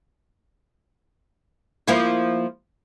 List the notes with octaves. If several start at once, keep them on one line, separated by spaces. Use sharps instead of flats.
F3 A#3 E4